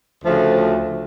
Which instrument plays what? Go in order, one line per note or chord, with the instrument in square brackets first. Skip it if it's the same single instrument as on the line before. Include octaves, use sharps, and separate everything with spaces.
[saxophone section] D2 C#3 F3 A3 E5